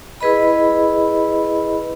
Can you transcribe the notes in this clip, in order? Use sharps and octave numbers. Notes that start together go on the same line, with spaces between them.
E4 G#4 B4 D#5 B5